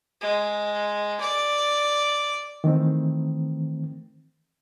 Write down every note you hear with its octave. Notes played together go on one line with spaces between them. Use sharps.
G#3
D5
D#3 E3 A3 C4